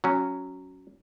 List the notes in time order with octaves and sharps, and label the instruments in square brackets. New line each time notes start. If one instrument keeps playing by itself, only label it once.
[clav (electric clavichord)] F#3 C#4